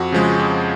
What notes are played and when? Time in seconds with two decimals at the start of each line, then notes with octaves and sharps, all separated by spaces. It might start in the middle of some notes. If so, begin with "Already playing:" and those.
Already playing: F2 F#4
0.12 C#3 F3 G#3
0.39 F2